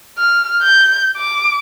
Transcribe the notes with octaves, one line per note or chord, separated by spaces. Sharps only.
F6
G6
D6